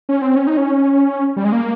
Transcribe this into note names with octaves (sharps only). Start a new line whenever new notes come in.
C#4
C4
C#4
D#4
C#4
G3
G#3
A#3